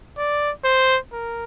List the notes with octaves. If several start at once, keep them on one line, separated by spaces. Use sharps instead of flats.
D5
C5
A#4